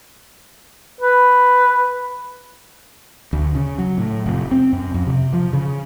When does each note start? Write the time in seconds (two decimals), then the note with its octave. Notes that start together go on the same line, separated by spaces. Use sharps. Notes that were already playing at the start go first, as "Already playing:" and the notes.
1.01 B4
3.33 D2
3.55 C#3
3.78 F#3
3.98 A2
4.26 F1
4.51 C4
4.73 F#2
4.94 F2
5.07 C3
5.33 F3
5.53 C#3